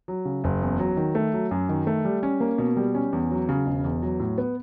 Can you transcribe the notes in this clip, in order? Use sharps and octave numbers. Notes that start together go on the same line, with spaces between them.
F#3
C#3
F#1
E2
F#3
D#3
A3
F#3
F#2
D#3
A3
G3
C#4
A#3
B2
G3
C#4
E2
F#3
C#3
E1
E2
F#3
A2
B3